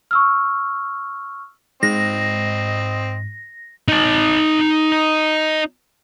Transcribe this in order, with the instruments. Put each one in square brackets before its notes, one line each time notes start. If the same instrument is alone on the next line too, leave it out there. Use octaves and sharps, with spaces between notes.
[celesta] C#6 E6 F6
[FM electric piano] G#2 [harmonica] C4 D#5 [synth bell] A#6
[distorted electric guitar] D#4 A5